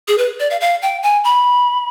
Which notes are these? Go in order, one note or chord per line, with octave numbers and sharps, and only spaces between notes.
G#4
B4
D5
F5
F5
G5
G#5
B5